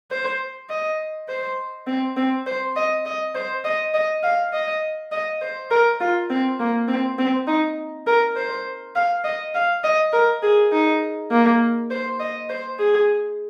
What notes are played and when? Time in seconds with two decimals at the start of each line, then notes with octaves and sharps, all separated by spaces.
0.11 C5
0.70 D#5
1.29 C5
1.87 C4
2.17 C4
2.46 C5
2.76 D#5
3.06 D#5
3.35 C5
3.65 D#5
3.94 D#5
4.23 F5
4.53 D#5
5.12 D#5
5.41 C5
5.71 A#4
6.00 F4
6.30 C4
6.60 A#3
6.88 C4
7.19 C4
7.47 D#4
8.07 A#4
8.36 C5
8.96 F5
9.24 D#5
9.55 F5
9.84 D#5
10.13 A#4
10.43 G#4
10.72 D#4
11.31 A#3
11.91 C5
12.20 D#5
12.50 C5
12.79 G#4